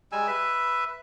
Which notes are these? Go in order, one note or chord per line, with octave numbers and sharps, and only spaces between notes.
G3 G#3 G#5 E6
B4 E5